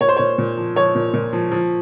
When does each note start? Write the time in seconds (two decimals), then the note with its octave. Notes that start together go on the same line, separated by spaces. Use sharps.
0.01 A#2 C#5
0.09 C5
0.17 A#2 C#5
0.38 A#2
0.57 F3
0.76 F3 C#5
0.95 A#2
1.14 A#2
1.33 F3
1.51 F3